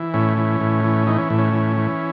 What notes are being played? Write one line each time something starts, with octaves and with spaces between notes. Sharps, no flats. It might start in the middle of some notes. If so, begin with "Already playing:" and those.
Already playing: E3
A2 C#4
E3
A2
E3
E3 D#4
C#4
A2
C#4
E3
E3